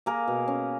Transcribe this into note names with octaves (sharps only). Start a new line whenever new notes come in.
A#3 G#4 A#4
B2
C#4